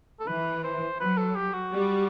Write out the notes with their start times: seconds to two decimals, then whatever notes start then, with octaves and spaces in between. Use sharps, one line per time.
0.20 A4
0.27 E3 B4
0.63 C5
0.99 F#3 B4
1.17 A4
1.35 G4
1.53 F#4
1.72 G3